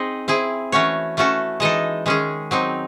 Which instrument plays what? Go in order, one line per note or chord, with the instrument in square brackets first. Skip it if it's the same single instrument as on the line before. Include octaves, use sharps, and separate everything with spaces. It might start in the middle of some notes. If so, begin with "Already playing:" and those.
Already playing: [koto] C4 D#4 G#4 D#5
C4 E4 G#4
E3 A3 C#4 F#4 C#5
E3 A3 C#4 F#4 A4
E3 G#3 D#4 A4 D#5
D#3 G#3 C#4 G#4
F#3 C4 D#4